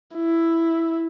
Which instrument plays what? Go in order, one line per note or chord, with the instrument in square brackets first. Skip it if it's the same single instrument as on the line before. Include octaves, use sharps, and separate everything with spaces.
[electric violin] E4